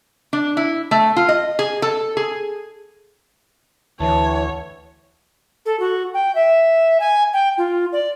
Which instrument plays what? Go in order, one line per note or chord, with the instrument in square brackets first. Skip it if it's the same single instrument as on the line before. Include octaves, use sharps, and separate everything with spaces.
[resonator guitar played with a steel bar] D4
E4
A3
F4
D#5
G#4
A4
G#4
[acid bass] D2 [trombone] E3 [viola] C#5 [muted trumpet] A5
[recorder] A4
F#4
G5
E5
G#5
G5
F4
D5